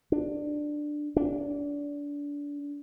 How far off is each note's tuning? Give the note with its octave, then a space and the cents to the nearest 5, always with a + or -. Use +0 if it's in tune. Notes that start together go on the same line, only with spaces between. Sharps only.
D4 +10
D4 -25